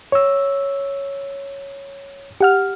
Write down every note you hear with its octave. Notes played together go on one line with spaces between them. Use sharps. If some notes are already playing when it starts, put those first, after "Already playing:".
C#5 E6
G4 F#5 F6